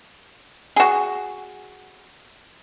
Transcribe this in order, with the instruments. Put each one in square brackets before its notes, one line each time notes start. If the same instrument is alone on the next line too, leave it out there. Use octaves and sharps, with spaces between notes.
[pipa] F#4 G#4